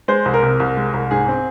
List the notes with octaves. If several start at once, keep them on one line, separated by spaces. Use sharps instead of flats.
G#3 C5
C2
A#4
C3
C2
G#3
C2
G#2 G#4
C4